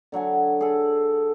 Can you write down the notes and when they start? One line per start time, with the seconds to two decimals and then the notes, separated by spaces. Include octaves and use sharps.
0.12 D3 F#3 F#5 G#5
0.61 G#4 A4